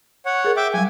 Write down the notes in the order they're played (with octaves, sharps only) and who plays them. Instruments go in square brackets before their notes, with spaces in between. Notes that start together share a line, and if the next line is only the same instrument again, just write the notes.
[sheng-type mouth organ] C#5 F#5
[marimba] G#4 A#4
[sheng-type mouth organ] E5 G5 D6
[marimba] F#3 G3 [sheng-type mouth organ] G#5